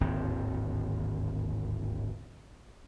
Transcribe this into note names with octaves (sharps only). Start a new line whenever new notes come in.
D1 G#1 D#2 C4